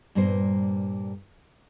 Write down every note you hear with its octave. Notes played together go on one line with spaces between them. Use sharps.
G2 A#2 G3 A#3 B3 C5